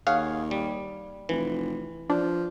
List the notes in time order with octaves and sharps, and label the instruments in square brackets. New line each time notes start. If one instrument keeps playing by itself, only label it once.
[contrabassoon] D#2 [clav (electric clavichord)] G#4 C#5 F#5 [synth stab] F5
[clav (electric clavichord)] G3
[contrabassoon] F1 [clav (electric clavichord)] E3
[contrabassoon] F3 [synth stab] D4